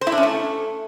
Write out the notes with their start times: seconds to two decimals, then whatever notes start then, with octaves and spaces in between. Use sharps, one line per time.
0.01 C5
0.07 E4
0.12 D4
0.18 C#4
0.23 A3